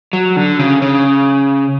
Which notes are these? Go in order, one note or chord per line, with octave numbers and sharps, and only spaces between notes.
F#3
D3
C#3
C#3